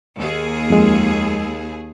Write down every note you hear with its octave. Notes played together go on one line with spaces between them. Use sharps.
D#2 G#4
F2 G#3